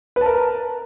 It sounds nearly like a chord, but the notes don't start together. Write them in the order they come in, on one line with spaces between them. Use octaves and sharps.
B4 A5 A#4